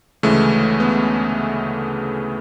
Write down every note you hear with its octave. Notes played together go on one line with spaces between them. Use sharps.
D2 C#3 E3 G#3 A3
B3